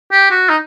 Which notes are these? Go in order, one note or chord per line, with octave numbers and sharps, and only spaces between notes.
G4
F#4
D#4